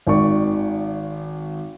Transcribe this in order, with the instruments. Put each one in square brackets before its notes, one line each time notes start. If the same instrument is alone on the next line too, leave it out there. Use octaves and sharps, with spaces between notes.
[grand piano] G#1 D#3 D5 C#6